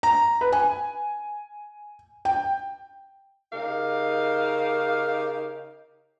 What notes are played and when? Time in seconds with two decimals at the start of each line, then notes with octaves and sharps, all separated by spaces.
0.03 A#5
0.41 B4
0.52 G#5
2.25 G5
3.53 C#3 D#4 G4 A#4 F5